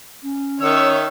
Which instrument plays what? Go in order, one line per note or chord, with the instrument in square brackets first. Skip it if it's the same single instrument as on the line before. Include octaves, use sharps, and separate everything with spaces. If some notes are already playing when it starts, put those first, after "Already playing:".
[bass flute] C#4
[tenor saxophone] D#3 [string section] C#5 E5 [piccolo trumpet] E6